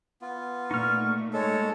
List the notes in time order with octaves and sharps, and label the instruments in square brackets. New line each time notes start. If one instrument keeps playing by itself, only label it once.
[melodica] B3 F4
[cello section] A#2 A3 [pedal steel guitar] D#4 F6 [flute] C#6
[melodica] G#3 A4 [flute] C#5